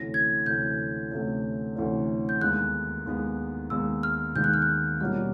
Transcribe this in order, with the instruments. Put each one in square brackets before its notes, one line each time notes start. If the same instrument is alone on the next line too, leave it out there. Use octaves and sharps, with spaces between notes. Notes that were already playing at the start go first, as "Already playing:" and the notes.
Already playing: [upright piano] D2 C3 E3 A3 C#4 [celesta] A#6
[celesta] G#6
[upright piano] D2 C3 E3 A3 C#4 [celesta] G6
[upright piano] D2 C3 E3 A3 C#4
D2 C3 E3 A3 C#4
[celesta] G6
[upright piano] D#2 D#3 G#3 B3 [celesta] F#6
[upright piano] D#2 D#3 G#3 B3
[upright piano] D#2 D#3 G#3 B3 [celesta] E6
[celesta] F6
[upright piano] D#2 D#3 G#3 B3 [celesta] G6
[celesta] F#6
F6
F#6
[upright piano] B2 G3 A#3 C#4 F4 [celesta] F6